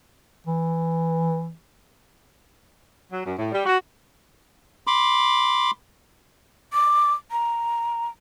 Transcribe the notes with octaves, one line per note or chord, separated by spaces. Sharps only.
E3
F#3
F#2
A2
G3
F#4
B5 C6 D6
D6
A#5